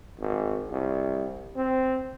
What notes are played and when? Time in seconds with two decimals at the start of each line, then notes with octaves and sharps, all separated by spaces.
0.20 G#1
0.70 C2
1.56 C4